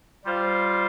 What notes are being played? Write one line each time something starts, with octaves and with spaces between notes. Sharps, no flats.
G3 F4 C5 F5